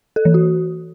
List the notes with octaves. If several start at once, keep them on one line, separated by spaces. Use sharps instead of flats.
A4
E3
F#4